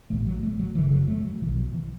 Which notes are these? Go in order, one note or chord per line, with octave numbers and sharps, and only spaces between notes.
A1 A2 A3
F#3
A3
F#3
F#1 F#2 C#3 E3
F#3
A3
F#3
B1 B2 E3
F#3
E3